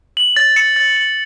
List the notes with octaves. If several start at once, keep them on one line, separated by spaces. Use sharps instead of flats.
F#7
A6
C#7
A6
F#7